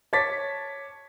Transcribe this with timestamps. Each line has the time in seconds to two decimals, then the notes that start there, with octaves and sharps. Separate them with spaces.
0.13 C#5 A5 D6 A6 B6